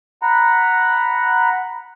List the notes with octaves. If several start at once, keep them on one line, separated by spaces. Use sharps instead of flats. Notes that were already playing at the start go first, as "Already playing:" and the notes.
F#5 A#5 B5